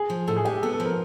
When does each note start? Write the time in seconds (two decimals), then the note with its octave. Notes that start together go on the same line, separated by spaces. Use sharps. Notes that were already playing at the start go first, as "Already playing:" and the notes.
Already playing: G#4
0.10 F3
0.28 A2 A4
0.37 G#4
0.45 G#3 G4
0.62 B3 A4
0.74 A4
0.80 F3
0.86 A#4